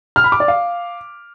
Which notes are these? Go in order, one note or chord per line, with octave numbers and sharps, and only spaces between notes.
F6
B5
D6
D5
F5